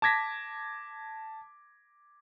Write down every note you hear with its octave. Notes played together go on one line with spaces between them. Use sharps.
A5 D6 G#6 A#6 B6